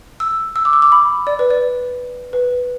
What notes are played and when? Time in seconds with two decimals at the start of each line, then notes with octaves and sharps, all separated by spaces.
0.20 E6
0.56 E6
0.65 D6
0.73 E6
0.82 D6
0.92 B5
1.27 D5
1.39 B4
1.50 D5
2.33 B4